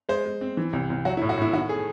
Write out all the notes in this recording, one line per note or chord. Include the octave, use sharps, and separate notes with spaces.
G#3 C5
G#3
C4
E3
C2
C2
F#3 F#4
E4
A2
F#4
A2 E4
D#3 F#4
A3 G#4